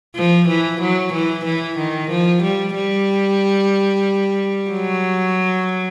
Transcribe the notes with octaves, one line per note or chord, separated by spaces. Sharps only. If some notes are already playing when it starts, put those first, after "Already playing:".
F3
E3
F#3
E3
E3
D#3
F3
G3
G3
F#3